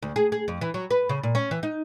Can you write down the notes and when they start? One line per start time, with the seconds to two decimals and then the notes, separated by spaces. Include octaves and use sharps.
0.02 D2
0.16 G#4
0.32 G#4
0.48 F2
0.61 E3
0.74 F#3
0.90 B4
1.09 C#3
1.23 A#2
1.35 C#4
1.51 E3
1.63 D#4